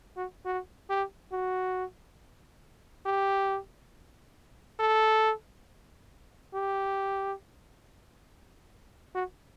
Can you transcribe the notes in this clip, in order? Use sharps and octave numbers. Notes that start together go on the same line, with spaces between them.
F#4
F#4
G4
F#4
G4
A4
G4
F#4